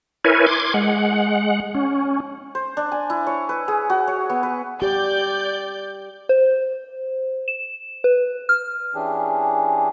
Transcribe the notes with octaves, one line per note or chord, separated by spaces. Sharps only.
E4 A#4 B4 C#5 G#5
C6 D6 G#6
G#3 F#5
C#4
C5
D4
G#5
E4
C#5
B4
G#4
F#4
C#5
B3
B4
G4 D5 G6
C5
E7
B4
F6
E3 C#4 D4 G4 G#4